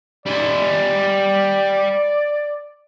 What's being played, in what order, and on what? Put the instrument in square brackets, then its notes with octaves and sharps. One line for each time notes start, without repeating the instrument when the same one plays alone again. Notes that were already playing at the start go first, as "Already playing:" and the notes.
[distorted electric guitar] G3 G#5 [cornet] D5